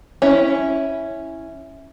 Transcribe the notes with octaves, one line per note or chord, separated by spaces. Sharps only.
C#4 E4